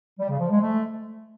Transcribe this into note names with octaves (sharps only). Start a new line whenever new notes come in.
G3
C#3
F3
G#3
A3